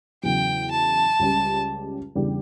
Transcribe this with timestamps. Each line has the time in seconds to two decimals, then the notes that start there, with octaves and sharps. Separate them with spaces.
0.24 E2 C#3 F#3 G5
0.71 A5
1.19 C#2 C#3 G3 C#4 G4
2.15 E2 C#3 G3 D4 G4